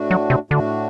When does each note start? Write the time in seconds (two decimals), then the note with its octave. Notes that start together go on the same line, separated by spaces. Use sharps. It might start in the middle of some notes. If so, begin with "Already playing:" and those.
Already playing: A2 A3 D4 F#4
0.11 F#3
0.30 C3
0.50 A2 D3 A3 D4 F#4